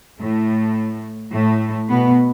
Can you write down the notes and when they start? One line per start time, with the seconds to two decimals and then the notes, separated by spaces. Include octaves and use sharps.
0.19 A2 A3
1.33 A2 A3
1.89 B2 B3